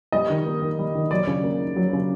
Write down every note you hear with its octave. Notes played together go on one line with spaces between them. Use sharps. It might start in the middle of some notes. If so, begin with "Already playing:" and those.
G3 D#5
D#3
A#3
D#3
G3
D#3
F#3 D5
C#3
A#3
D#4
F#3
C#3